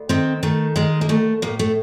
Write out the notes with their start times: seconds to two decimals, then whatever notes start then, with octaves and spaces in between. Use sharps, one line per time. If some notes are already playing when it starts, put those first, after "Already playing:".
Already playing: D2
0.09 D#3 C4
0.43 D#3 A3
0.76 D#3 G#3
1.01 A#3
1.09 D#2 A3
1.42 A2 A#3
1.59 A3